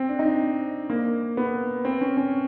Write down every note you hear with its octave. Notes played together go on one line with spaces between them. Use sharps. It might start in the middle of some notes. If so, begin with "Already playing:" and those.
Already playing: C4
D4
D#4
D4
A#3
B3
C4
C#4
C#4